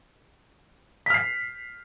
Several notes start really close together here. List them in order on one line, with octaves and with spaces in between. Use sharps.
B6 F6 C7